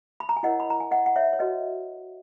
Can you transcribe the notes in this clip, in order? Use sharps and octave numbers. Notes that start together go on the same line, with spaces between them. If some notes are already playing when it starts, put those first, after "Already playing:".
B5
A#5
G#5
E4 A#4 C#5 D#5 F#5
B5
A#5
G#5
D#5 F#5
F#5
C#5 E5
C#5
F#4 B4 D#5